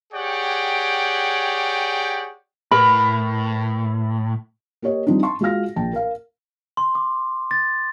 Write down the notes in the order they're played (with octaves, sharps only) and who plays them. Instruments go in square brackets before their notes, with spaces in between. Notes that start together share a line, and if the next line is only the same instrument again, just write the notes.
[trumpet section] G4 G#4 C#5 D5 F#5 G5
[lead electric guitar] A2 [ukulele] A#4 B4 B5
[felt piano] A#3 G4 C#5 D#5
F3 G3 C4 D4 D#4
A5 C6 C#6
G#3 F4 F#4 F5 F6 A#6
A#1 G5 A5
A#4 F5
[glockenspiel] C6
D6
A6